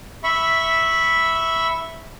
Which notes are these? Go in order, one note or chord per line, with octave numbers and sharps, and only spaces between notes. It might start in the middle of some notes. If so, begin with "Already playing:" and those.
E5 B5 C#6